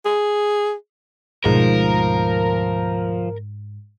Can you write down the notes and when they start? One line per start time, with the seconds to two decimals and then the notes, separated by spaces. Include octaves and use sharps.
0.05 G#4
1.45 D2 G#2 B2 F3 A#4